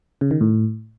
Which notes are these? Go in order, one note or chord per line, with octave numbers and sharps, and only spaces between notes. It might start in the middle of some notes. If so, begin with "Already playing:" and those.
C#3
D#3
A2